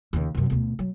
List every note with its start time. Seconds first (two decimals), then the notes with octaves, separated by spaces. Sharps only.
0.13 D#2 C#3
0.35 F#2 C3
0.50 D2 B2
0.79 F#3